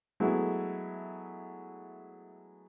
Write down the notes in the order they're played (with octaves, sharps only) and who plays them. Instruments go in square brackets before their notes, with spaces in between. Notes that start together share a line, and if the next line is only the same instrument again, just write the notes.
[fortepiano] F#3 G#3 A3 B3 E4